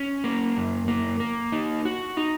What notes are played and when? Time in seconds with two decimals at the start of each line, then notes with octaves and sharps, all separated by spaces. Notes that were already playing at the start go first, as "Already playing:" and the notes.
Already playing: C#4
0.24 A#3
0.57 F#2
0.88 A#3
1.20 A#3
1.52 D#4
1.85 F#4
2.17 D#4